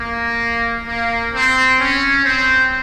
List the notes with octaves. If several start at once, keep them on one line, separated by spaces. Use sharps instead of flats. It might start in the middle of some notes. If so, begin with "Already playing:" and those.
Already playing: A#3
A#3
C4
C#4
C4